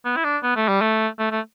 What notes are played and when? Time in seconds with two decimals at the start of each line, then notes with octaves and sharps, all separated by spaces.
0.05 B3
0.16 E4
0.24 D4
0.43 B3
0.56 A3
0.68 G3
0.81 A3
1.19 A3
1.31 A3